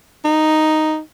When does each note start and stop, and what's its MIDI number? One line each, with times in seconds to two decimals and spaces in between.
0.25 0.99 63